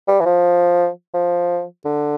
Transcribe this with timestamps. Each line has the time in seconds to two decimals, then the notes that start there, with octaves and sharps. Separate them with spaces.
0.08 G3
0.21 E3
0.26 F3
1.14 F3
1.85 D3